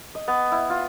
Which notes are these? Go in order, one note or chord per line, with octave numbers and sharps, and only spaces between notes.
D#5
B3
E4
F4